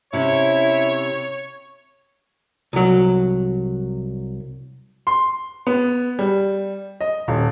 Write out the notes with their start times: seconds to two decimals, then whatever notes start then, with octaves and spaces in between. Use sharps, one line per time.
0.13 C3 C#4 E4 C#5
2.73 C2 F#3
5.07 C6
5.67 B3
6.19 G3
7.01 D#5
7.28 D#1